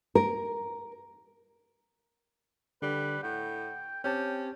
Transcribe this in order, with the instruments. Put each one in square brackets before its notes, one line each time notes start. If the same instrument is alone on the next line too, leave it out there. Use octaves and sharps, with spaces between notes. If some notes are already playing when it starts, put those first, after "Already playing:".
[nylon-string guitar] A#4
[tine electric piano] D3 [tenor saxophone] G3 [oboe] B4
[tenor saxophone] A2 [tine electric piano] F#5 [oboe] G5
[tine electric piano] C4 G4 A5 [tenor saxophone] C#4 [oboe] G5